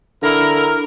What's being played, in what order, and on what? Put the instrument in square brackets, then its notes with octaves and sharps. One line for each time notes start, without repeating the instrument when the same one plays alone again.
[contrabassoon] D3 [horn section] E4 A#4